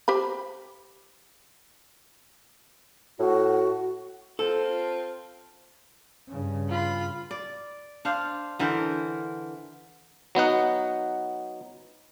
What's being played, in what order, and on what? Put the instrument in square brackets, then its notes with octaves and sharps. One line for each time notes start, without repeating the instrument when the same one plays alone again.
[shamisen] G4 C5 B5
[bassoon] A2 [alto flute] F#4
[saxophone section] C4 F4 [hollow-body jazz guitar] A4
[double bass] G2 C#3
[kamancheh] F4 B5
[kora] D5
D4 C5 F5
D3 E3 A#4 C5
[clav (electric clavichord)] F#3 B3 D#4 F#5